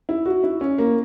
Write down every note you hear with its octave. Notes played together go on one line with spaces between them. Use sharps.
E4
F#4
E4
C#4
A#3